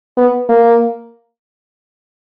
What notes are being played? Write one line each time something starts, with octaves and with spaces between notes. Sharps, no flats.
B3
A#3